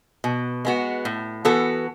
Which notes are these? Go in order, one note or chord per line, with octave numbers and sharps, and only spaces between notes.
B2
G#3 B3 F#4
A2
E3 B3 F#4 A4